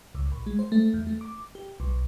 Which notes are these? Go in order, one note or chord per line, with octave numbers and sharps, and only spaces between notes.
C#2
A#1
G#3
C5
A3
E2
A3
D6
G4
B1